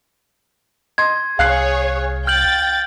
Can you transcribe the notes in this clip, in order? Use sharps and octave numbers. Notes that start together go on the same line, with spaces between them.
D#5 C6 G#6
C2 G#4 C#5 F5 F#6 C7
G5 F6 G6 A6 F#7